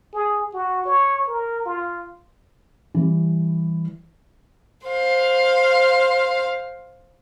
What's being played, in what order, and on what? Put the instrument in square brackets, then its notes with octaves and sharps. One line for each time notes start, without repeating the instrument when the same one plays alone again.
[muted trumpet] G#4
F#4
C#5
A#4
F4
[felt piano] E3 G3
[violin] C5 F5